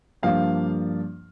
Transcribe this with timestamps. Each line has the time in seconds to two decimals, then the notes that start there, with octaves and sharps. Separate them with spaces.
0.22 G2 F3 A#3 D4 F5